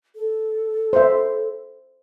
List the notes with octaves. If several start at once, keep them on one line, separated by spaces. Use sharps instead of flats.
A4
C5 E5